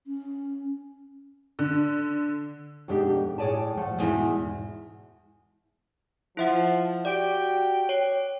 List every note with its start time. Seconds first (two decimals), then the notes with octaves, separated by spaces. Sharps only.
0.07 C#4
1.59 D3
2.88 F2 B2 G#3 D4 D#4 G4
3.38 A2 G#4 C#5 D5 G#5 A5
3.77 F3 A3 F#5
3.98 E2 G#2 B2 E3 G#3 E4
6.37 F3 E4 E5 F#5
7.05 F#4 G4 D5 G5 D7
7.89 C#5 G5 D7